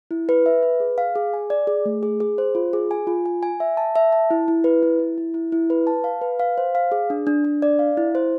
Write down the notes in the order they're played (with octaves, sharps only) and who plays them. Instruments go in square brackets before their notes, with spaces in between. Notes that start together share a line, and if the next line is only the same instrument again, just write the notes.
[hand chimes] E4
B4
E5
B4
G#4
F5
G#4
G#5
D5
G#4
A3
G#4
G#4
C5
F4
G#4
G#5
F4
G#5
G#5
E5
A5
E5
A5
E4
E4
B4
E4
E4
E4
E4
E4
B4
A5
F5
B4
F5
C5
F5
G#4
D4
D4
D4
D5
F5
E4
C5